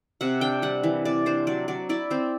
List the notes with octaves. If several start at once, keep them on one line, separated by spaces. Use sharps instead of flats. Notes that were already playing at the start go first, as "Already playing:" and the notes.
C3 F#5
D4 G5
G3 F#5
E3
C3 D5
D4 C5
F#3 D5
F#3 D5
E4 D5
C4 C5